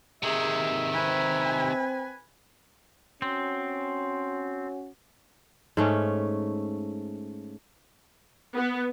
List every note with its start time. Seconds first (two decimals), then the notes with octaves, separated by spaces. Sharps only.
0.23 C3 D#3 G#4 E5
0.93 C4 B4 G#5
3.22 C4 C#4 F#4
5.77 G#2 A3 C#4
8.55 B3